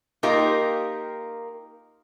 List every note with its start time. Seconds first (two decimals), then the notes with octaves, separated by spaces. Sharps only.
0.23 A#3 D#4 F4 G4 A#4